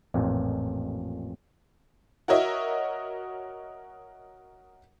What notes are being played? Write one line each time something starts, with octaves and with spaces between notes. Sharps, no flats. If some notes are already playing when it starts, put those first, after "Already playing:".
A1 F2 A#2
F#4 A#4 C#5 D#5 E5